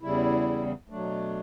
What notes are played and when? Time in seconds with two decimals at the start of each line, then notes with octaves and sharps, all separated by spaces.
0.02 E2 C#3 G3 E4
0.90 B2 F#3 A3 D4